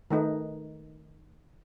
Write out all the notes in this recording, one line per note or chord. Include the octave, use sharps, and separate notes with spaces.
D#3 A3 D#4 B4